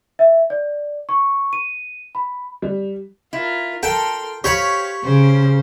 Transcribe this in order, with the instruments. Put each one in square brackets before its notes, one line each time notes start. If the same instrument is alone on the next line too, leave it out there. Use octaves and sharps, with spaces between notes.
[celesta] E5
D5
C#6
D#7
B5
[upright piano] G3
[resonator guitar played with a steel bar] E4 [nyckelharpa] F4 A#4
[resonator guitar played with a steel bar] A4 [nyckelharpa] A#4 C6 [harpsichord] G5
[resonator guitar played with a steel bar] G4 [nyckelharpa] C5 F5 [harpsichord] C#5 B5
[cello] C#3 [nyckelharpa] C5